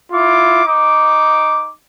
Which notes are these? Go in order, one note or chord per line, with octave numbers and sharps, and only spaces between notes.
E4 F4 D6
D#4 D6